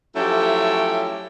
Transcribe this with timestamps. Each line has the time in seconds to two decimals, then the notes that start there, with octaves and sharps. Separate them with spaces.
0.16 F3 F#3 A3 C#4 E4 G4